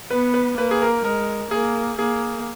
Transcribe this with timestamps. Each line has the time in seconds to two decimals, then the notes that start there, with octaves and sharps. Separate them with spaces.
0.10 B3 B4
0.34 B4
0.57 A#3 B4
0.71 G#4
0.82 A#4
1.04 G#3 A#4
1.51 A#3 G#4
1.99 A#3 G#4